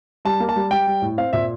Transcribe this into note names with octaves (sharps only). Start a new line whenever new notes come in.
G3 A5
A#3
A5
G3
G3 G5
G3
A2
C4 F5
A#2 E5